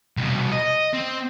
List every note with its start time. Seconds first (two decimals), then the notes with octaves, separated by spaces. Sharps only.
0.17 C2 B2
0.52 D#5
0.93 C4